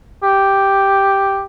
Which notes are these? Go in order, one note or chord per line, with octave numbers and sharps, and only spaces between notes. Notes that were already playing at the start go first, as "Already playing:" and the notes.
G4